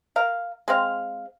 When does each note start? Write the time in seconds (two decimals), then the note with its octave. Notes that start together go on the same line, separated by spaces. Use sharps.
0.16 A#4 F5
0.68 G#3 C4 F5